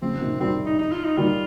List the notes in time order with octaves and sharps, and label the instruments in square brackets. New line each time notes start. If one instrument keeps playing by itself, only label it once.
[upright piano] C#3 F3 [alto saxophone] C4
[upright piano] C3 D#3
[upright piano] D#3 G3 [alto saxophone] C4
[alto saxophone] D#4
D#4
F4
D#4
[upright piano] D#3 G3 [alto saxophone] F4